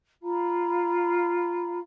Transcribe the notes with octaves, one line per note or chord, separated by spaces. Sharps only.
F4 F5 A#5 B5